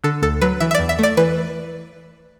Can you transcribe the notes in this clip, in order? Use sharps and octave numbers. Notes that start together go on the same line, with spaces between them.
D3 A4
D2 A4
F#3 B4
E3 E5
E5
D5
E2
E5
A3 D5
E3 B4